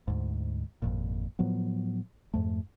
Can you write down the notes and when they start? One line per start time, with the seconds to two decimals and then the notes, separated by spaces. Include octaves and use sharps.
0.08 D2 G#2
0.82 G#1 F2 A#2
1.39 A2 F3 F#3 B3
2.34 F2 G#2 A3